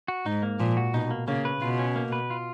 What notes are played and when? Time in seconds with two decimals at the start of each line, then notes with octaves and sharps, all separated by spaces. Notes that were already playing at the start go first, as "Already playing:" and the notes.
0.08 F#4
0.26 G#2 D#4
0.43 A#3
0.59 A#2 F3
0.77 F#4
0.94 B2 D#4
1.11 A#3
1.27 C#3 A#3
1.45 B4
1.62 B2 F4
1.79 C#4
1.96 A#3
2.12 B4
2.30 F4